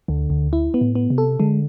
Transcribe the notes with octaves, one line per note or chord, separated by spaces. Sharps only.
D2 D3
D2
E4
B3
A2
B3
C3
A4
D3 G#3